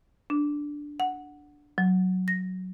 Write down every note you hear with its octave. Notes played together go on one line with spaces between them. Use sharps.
D4
F#5
F#3
A#6